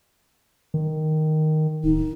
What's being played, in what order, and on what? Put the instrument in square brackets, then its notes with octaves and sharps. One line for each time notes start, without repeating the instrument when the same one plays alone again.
[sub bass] D#3
[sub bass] D1 [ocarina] D#4